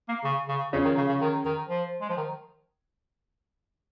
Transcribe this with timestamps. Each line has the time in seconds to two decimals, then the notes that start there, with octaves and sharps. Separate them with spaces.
0.09 A#3
0.24 C#3
0.48 C#3
0.73 C#3 F3 C#4 G#4
0.85 D#3
0.97 C#3
1.09 C#3
1.21 D#3
1.45 D#3
1.69 F3
2.01 G#3
2.09 F3
2.17 D#3